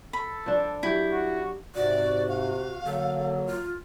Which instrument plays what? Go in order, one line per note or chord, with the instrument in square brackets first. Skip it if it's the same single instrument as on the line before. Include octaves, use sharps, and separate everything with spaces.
[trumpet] A4 [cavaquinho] B5
[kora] F3 D4
[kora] F#3 G4 [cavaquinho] E4
[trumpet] F#4
[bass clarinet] G#2 [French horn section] C3 [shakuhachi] F#4 [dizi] D5
[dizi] F5
[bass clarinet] D3 [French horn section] F#3 A#3 [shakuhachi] A4
[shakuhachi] F4